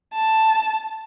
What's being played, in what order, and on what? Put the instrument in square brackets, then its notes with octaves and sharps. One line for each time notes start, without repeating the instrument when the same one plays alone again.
[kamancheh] A5